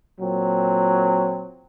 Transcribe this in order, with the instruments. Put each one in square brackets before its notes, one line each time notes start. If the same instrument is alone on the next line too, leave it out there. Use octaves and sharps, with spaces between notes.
[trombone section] A#2 F#3 C4